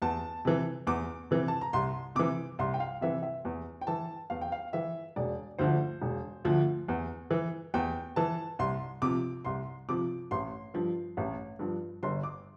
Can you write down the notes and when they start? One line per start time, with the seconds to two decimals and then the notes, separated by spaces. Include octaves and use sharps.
0.02 E2 A5
0.45 C3 E3
0.87 E2 D6
1.31 C3 E3
1.48 A5
1.61 A#5
1.73 C2 C6
2.15 C3 E3 D6
2.59 C2 C6
2.74 G5
2.80 F5
3.01 C3 E3 E5
3.23 E5
3.45 E2
3.81 G5
3.87 E3 A5
4.30 E2 F5
4.41 G5
4.52 F5
4.73 E3 E5
5.16 E1 D5
5.59 D2 D3 F3 C5
6.02 E1
6.45 D2 D3 F3
6.88 E2
7.31 E3
7.74 E2 G5
8.16 E3 A5
8.59 C2 C6
9.02 C3 F3 D6
9.45 C2 C6
9.89 C3 F3 D6
10.31 A1 C6
10.74 G2 F3
11.17 A1
11.59 G2 F3
12.03 G1 C6
12.23 D6